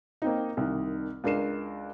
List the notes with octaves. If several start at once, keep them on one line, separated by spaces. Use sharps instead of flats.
A#3 C4 D#4
C2 D#3
C#2 D4 A#4 C7 E7